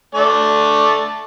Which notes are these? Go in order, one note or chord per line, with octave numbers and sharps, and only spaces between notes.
A3 D5 A5